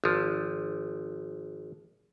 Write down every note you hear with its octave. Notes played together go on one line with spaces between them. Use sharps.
G#1 F3